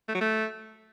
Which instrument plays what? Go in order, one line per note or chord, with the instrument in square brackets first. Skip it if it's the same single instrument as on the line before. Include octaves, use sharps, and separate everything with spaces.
[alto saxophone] A3
F#3
A3